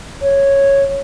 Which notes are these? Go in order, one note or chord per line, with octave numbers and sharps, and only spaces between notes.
C#5